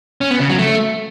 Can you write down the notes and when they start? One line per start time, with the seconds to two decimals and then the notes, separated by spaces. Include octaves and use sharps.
0.21 C#4
0.30 B3
0.40 C#3
0.49 F#3
0.59 A3